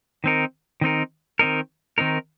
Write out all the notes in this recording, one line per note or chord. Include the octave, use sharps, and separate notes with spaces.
D#3 C4 D#4 A#4
D#3 C4 D#4 A#4
D#3 C4 D#4 A#4
D#3 C4 D#4 A#4